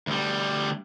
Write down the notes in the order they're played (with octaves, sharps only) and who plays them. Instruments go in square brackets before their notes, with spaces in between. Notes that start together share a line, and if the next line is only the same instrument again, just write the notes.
[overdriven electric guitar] D2 G3